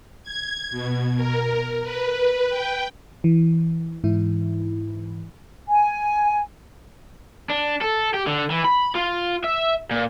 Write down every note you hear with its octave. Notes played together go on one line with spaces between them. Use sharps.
G#6
B2
A#4
B4
G5
E3
G#2 E3 E4
G#5
D4
A4
G4
D3
E3
B5
F4
E5
A#2